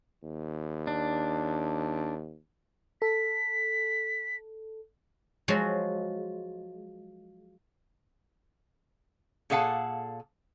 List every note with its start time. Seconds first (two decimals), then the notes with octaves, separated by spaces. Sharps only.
0.23 D#2
0.87 D4
3.02 A4 B6
5.48 F3 F#3 G#3 F#4
9.50 A#2 G#4 A4 F5 F#5 A5